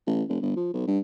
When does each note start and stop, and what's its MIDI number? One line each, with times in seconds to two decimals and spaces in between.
0.07 0.23 33
0.29 0.37 29
0.41 0.55 31
0.56 0.71 53
0.73 0.83 35
0.87 0.99 43